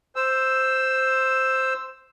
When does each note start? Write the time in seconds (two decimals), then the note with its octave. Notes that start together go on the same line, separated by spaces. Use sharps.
0.16 C5 E6